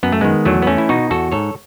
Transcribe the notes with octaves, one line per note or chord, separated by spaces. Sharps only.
F#2 B3
A3
D#3 G#3 B3
E2 F#3 A3
B3
E3 A3 C#4
E4
B2 D#4 F#4
E2 F#4 A4
G#2 A4 C#5